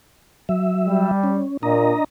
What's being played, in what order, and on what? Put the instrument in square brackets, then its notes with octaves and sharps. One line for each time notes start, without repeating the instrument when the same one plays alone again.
[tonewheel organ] F#3 E5
[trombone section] G3
[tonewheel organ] C#4
[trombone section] A#2 [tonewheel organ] D4 D#5 A#5